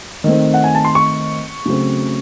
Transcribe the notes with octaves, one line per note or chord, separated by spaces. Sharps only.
D#3 A3 C4
F#5
G#5
A5
C6
C#6
C#3 F#3 A3 C4